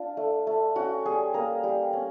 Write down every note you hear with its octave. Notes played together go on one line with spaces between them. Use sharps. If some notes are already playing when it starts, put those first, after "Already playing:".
Already playing: D4 F4
A3
A3
C#4 F#4
G3 G#4
A#3 A#4
G3
C#4